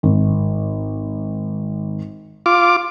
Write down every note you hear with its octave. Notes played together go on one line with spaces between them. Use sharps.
G#1
F4 D6